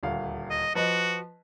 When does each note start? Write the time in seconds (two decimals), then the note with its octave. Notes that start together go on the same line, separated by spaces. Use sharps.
0.03 D#1 D2 F5
0.50 D#5
0.75 F3 F#4 B4 D#5